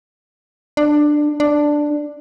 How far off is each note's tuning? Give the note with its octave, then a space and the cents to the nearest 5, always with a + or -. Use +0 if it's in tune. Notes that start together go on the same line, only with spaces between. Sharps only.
D4 +15
D4 +5